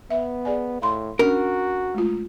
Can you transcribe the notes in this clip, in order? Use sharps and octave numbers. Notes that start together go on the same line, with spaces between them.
B3 E5
G#4 D5 G#5
A2 F5 B5 C6
C#4 D4 F#4 A#4
G#3 A3 F4